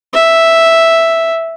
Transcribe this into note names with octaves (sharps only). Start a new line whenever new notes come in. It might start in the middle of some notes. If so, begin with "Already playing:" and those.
E5